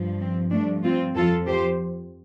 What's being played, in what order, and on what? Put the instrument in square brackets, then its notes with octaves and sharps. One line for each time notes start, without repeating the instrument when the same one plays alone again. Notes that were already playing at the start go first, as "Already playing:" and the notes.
Already playing: [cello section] G2 F3
C4
G2 F3 A3 D4
C4 F4
F2 F3 F4 A4
G4 C5